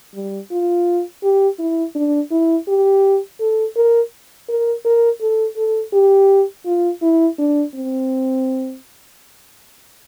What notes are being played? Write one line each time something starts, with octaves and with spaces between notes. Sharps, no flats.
G3
F4
G4
E4
D4
E4
G4
A4
A#4
A#4
A#4
A4
A4
G4
F4
E4
D4
C4